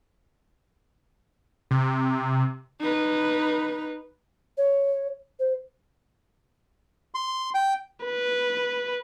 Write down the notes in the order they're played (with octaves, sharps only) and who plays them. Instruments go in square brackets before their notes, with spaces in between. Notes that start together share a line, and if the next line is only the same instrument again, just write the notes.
[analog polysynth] C3
[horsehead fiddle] D#4 B4
[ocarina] C#5
C5
[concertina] C6
G5
[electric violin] B4